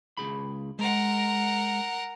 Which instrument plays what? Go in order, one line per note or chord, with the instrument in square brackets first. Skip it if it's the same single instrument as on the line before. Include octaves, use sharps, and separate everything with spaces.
[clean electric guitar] C#2 G#4 B5
[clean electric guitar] G#3 [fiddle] A#4 F#5